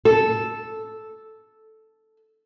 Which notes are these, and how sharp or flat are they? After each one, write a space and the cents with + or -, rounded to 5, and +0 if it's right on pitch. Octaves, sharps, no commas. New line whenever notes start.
A4 -5